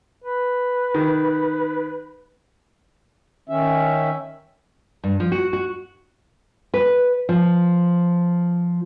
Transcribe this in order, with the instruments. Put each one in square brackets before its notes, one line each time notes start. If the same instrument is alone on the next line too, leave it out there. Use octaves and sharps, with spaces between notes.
[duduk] B4
[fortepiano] D#3
[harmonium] D#3 C#4 E5
[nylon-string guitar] G2
F3
F#4
F#4
B4
F3